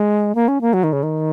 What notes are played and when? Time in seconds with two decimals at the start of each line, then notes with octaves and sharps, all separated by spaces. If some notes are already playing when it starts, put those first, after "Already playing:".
Already playing: G#3
0.35 A#3
0.48 C#4
0.61 A#3
0.73 F#3
0.84 D#3
0.93 C#3
1.03 D#3